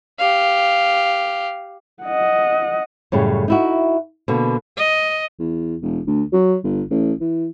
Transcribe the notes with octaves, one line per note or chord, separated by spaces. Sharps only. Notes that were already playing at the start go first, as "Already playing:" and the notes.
G4 F5
D#5 F#5
F#2 A2 C#3 G3
D#4 E4 F#4
B2 D3 A#3
D#5
E2
E1
D2
F#3
G1
A1
E3